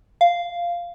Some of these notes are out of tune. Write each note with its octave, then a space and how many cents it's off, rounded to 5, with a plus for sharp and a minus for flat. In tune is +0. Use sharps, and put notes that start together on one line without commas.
F5 -10